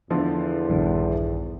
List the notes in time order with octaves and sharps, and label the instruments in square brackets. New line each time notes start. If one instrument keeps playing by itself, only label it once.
[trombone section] E2 [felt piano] D3 F3 A3
[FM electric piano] A#1 G2 D#3